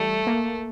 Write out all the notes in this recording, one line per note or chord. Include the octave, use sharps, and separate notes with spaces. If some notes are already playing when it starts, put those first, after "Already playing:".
Already playing: E3 G3 A3
A#3